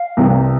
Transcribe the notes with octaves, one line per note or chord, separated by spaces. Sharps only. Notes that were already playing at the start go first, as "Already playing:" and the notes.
Already playing: F5
C2 C3 E3 G3